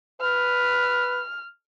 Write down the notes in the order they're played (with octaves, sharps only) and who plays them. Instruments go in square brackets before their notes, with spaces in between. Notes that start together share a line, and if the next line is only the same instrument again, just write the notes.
[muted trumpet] B4 [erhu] F6